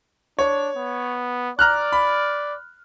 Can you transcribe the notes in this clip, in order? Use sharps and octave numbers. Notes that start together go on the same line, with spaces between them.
D4 C#5
B3
D5 A#5 F6 F#6
B5